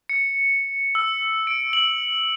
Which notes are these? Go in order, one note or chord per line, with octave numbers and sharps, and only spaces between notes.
C#7
E6
D7
F#7